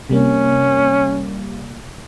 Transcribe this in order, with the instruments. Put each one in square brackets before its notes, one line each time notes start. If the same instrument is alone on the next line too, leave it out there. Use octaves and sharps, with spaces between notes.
[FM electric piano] C3 G3 A#3 [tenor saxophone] C#4